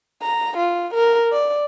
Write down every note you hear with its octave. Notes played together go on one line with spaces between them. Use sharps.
A#5
F4
A#4
D5